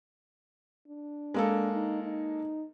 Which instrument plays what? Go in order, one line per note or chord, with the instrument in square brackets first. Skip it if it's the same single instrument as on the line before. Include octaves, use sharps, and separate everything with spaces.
[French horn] D4
[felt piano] G#3 A#3 A4
[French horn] D#4
D#4